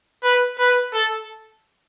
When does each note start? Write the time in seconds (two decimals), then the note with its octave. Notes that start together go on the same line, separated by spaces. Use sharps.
0.23 B4
0.59 B4
0.93 A4